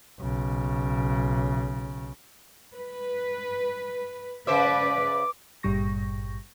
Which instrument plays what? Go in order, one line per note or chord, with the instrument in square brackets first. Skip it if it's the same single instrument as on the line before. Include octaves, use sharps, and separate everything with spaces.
[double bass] B1 C#3
[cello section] B4
[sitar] C#3 C5 E5 [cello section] B4 D5 [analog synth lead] D6
[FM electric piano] G#1 G2 A#2 G3 C#6 A#6